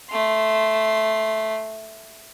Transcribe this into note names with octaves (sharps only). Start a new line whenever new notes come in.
A3 C6